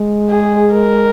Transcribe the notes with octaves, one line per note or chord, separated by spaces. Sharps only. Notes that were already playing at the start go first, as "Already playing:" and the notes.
Already playing: G#3
G#4
A#4